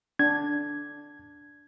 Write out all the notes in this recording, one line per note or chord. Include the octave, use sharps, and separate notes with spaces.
D4 G#6